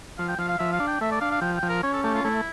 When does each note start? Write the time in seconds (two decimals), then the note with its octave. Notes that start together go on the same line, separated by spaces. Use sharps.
0.18 F3 F5
0.29 G5
0.39 F3 F5
0.49 F5
0.59 F3 E5
0.73 F5
0.80 D4
0.87 G5
1.01 A3 E5
1.12 D5
1.21 D4 F5
1.31 F5
1.41 F3 G5
1.56 G5
1.63 F3
1.69 A#4
1.83 C#4 C#5
1.94 A4
2.03 A3 G4
2.15 F4
2.24 A3 E4